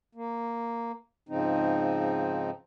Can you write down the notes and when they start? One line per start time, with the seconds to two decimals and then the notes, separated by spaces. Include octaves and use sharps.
0.15 A#3
1.29 G#2 C#3 F3 C4 D#4